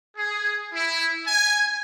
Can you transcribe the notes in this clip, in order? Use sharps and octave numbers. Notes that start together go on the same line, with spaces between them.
G#4
E4
G#5